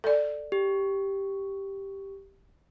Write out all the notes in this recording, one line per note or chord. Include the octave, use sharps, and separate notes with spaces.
A4 D5
G4